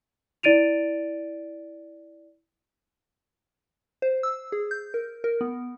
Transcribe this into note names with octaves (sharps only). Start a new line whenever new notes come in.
E4 D5 A6 D7 D#7 F7
C5
E6
G#4
G6
A#4
A#4
B3